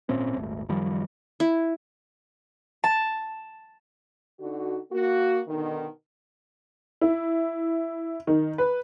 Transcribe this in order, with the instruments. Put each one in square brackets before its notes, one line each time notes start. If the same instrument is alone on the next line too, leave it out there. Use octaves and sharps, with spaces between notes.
[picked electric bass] G#1 A#2 C4 C#4
D#1 G#1 A3
F#2 D#3 F3 G3
[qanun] E4
[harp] A5
[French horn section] D3 D#4 F#4
A#3 F#4
B2 D3 D#3
[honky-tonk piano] E4
D#3
B4